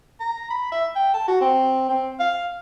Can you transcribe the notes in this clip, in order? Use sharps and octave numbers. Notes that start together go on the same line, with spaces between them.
A#5
B5
E5
G5
A5
F#4
C4
C4
F5